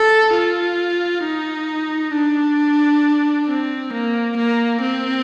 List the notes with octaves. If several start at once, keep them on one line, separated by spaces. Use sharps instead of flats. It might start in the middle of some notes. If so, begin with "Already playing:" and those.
Already playing: A4
F4
D#4
D4
C4
A#3
A#3
C4